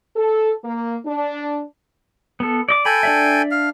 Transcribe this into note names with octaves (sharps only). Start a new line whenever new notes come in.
A4
A#3
D4
B3 A4
D5 D#5 D6
A4 G5 G#5 B5
D4 D5 E5
F5